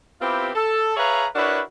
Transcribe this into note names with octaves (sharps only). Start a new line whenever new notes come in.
B3 C4 E4 F4 G4
A4
G#4 B4 C#5 E5 F5 A#5
D4 E4 F#4 A#4 B4 C#5